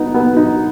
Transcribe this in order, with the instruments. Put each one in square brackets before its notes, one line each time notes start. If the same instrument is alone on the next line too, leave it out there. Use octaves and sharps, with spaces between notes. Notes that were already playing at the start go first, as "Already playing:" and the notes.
Already playing: [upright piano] B3 D#4
B3
D#4